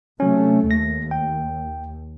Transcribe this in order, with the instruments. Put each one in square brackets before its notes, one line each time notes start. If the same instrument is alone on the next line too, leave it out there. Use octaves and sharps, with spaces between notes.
[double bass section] C3 A3 [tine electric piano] F#3 C#4
[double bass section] D#2 [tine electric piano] A#6
[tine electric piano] G5